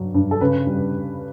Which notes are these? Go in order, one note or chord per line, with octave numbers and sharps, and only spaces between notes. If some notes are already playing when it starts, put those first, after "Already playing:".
Already playing: G2 F#3
G2
A4
C#3 B4
G3